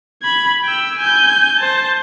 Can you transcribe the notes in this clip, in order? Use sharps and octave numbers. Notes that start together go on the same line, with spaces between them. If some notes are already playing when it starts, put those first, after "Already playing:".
B5 G#6
G5 E6
G#5 G6
C5 A5